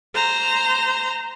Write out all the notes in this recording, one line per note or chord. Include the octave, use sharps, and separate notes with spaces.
C5 A#5